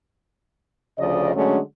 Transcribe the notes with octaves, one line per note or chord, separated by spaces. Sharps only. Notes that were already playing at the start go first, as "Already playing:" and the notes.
D2 C#3 F3 D5 D#5
D3 F#3 G#3 A3 C#4 D4